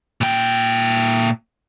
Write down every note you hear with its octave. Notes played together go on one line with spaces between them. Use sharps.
A#2 G5